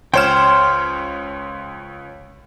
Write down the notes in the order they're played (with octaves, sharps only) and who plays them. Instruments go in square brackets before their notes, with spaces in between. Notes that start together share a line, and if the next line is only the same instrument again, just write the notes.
[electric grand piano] C#2 C#5 E7 [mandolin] C5 [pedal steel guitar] G5 F6